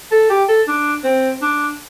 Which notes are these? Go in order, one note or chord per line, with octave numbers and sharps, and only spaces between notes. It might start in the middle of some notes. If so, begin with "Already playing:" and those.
A4
G4
A4
D4
C4
D4